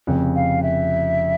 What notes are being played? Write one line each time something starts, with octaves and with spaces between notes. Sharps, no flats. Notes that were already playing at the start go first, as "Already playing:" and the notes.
F1 F2 C#3
F5
E5